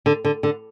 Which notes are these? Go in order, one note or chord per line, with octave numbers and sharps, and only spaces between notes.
D3
D3
D3